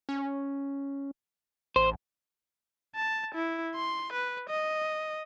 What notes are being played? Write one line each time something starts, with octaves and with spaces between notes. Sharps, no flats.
C#4
A1 C5
A5
E4
C6
B4
D#5